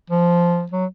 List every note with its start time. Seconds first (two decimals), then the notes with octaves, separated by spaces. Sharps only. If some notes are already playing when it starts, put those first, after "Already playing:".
0.10 F3
0.72 F#3